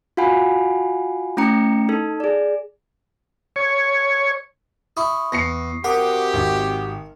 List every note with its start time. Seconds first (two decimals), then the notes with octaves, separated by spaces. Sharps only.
0.17 F4 F#4 F5 F#5 G#5 B5
1.37 A3 C#4 E4 G5 A#5 C#7
1.89 D#4 A4
2.20 G#4 D5
3.56 C#5
4.97 E4 C#6 D#6
5.32 E2 A#6 C7 C#7
5.84 C3 F#4 G4 A#4 F#5 D6 D#6
6.33 G#1